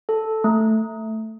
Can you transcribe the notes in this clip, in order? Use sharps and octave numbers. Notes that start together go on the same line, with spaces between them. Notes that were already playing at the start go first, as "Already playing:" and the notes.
A4
A3